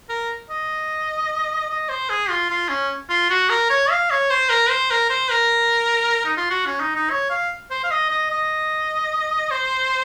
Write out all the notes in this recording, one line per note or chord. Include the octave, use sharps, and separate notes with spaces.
A#4
D#5
D#5
C5
G#4
F4
F4
C#4
F4
F#4
A#4
C#5
F5
C#5
C5
A#4
C5
A#4
C5
A#4
D#4
F4
F#4
C#4
D#4
D#4
C#5
F5
C5
F5
D#5
D#5
D#5
C5